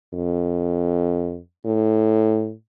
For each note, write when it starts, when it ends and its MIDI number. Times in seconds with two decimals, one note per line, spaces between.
0.13 1.39 41
1.65 2.53 45